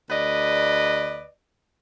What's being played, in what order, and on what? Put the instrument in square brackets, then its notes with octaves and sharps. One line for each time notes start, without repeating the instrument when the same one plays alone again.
[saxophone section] D2 B4 D5 D#5